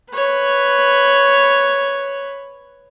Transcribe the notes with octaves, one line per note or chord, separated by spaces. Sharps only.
B4 C#5